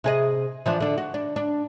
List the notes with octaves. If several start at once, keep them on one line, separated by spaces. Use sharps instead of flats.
C3 G#4 D#5
E3 F3 D4
D3 D4
F#4
D4
D4